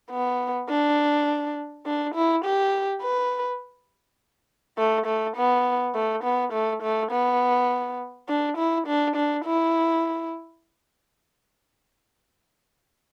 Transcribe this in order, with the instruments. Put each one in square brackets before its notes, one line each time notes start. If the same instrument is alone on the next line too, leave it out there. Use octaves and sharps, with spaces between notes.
[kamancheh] B3
D4
D4
E4
G4
B4
A3
A3
B3
A3
B3
A3
A3
B3
D4
E4
D4
D4
E4